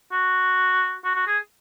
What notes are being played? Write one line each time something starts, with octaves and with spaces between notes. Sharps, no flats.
F#4
F#4
F#4
G#4